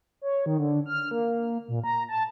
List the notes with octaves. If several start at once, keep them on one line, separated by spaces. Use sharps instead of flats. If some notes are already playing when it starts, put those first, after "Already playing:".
C#5
D#3
D3
F6
A#3
A#2
A#5
A5